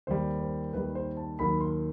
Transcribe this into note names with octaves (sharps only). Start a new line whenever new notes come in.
D#2 D#3 G3 C5
C5
D#2 D#3 G3 B4
C5
A5
D#2 D#3 F#3 B5
C6